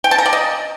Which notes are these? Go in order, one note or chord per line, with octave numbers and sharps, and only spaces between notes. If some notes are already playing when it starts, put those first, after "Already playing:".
G5
A5
A#5
D5
D#5